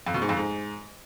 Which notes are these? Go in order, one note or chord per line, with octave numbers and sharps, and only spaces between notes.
F2
B2
G#2
F2
G#2